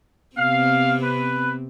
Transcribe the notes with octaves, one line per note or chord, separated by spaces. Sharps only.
C3 B3 C4 F5
B4